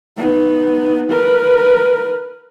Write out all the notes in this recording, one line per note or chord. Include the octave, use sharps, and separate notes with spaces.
B3 D#4
A#4 B4